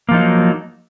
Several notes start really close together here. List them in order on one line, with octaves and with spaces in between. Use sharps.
A#3 F3 D#4 F#3